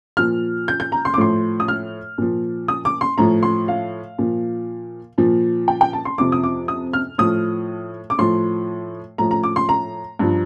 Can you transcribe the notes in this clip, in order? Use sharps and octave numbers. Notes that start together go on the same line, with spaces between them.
A#2 F3 F6
G6
G6
A#5
C6
D6
A2 F3 C6
D#6
F6
A#2 F3
D#6
D6
C6
A2 F3 A#5
C6
F5
A#2 F3
A#2 F3
G5
G5
A5
C6
F2 C3 F3 D6
D#6
D6
D#6
F6
A2 F3 D#6
D6
A2 F3 C6
A2 F3 A#5
A#5
D6
C6
A#5
G2 F3